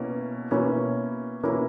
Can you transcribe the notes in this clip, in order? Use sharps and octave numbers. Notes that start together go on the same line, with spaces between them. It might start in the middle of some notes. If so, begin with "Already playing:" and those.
Already playing: B2 A#3 C#4 E4
B2 A#3 C#4 E4
B2 A#3 C#4 E4